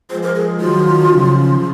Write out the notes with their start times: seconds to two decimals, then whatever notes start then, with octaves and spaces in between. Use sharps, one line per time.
0.10 F3 G#3 C5
0.23 A#4
0.35 G#4
0.60 D#3 F#3 F4
1.10 C#3 F3